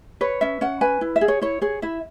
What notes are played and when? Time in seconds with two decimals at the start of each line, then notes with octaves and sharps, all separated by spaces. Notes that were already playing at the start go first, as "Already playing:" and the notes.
0.21 B4 C#5
0.41 C#4 E5
0.61 C#4 F#5
0.81 B4 G#5
1.01 E4
1.16 E5
1.21 G#4
1.28 C#5
1.41 E4 C#5
1.62 G#4 C#5
1.82 E4 E5